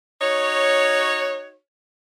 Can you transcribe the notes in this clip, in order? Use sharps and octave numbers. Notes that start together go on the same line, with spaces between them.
D#4 F#4 C#5